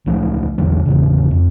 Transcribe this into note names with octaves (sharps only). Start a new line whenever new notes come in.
C#2 F3 A3
A#1 E2 D3 F#3
G1 E2 C#3
F2